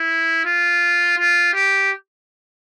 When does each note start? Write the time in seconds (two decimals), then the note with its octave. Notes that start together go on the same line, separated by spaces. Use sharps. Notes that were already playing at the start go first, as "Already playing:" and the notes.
Already playing: E4
0.46 F4
1.18 F4
1.54 G4